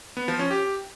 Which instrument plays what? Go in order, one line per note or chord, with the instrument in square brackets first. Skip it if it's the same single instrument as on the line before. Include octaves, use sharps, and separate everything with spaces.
[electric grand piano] B3
F3
C#4
G4